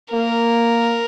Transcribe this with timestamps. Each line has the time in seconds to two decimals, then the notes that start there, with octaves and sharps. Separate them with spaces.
0.13 A#3 A#4